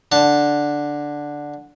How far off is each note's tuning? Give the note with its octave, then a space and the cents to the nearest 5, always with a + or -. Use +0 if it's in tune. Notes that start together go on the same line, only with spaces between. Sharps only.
D3 +0 A5 +0